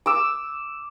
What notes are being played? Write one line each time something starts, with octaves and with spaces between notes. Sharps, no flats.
D6 E6